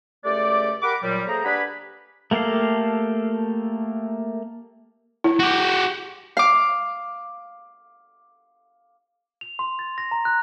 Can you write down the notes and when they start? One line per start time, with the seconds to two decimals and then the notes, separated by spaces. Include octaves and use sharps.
0.24 C#2 A3 G4 A4 D5
0.82 G4 A#4 F#5 B5 D6
1.03 A#2 F#3 G3
1.27 A3 A#3 G#4 C5 G5 A#5
1.44 D4 G4 B4 F#5 G#5 B5
2.31 A3 A#3 G4 A4 F5
5.24 E4
5.39 F#4 G4
6.37 F5 D6
9.41 F7
9.59 C6
9.79 A6
9.98 A#6
10.11 A#5
10.25 F#6